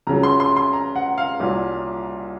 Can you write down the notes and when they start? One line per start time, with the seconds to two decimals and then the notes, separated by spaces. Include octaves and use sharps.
0.07 C#2 C#3 F#3 A#5
0.23 C6
0.40 C6
0.57 C6
0.73 A#5
0.96 F#5
1.18 F5
1.40 C2 A#2 F#3